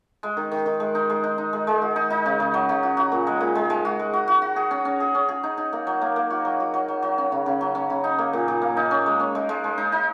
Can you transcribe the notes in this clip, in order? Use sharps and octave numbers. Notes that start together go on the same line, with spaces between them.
G#3
D#3
D#3
D#3
G#3
D#4
G#3
D#4
D#4
G#3
G#3
F#4
D#4
D#4
C#3
C#3
F#3
C#3
F#4
F#4
A#2
G#3
A#2
G#3
G#3
F#4
G#3
F#4
F#4
F#4
G#4
C#4
C#4
G#4
C#4
G#4
D#4
D#4
A#3
F#3
A#3
A#3
F#4
F#3
F#4
F#3
F#3
F#3
C#4
C#3
C#3
F#3
C#4
C#3
D#4
A#3
A#2
A#2
A#3
D#4
C#4
G#3
C#4
G#3
G#3
G#3
D#4
D#4